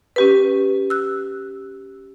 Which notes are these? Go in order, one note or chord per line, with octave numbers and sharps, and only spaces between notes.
C#4 G4 B4
E6 F#6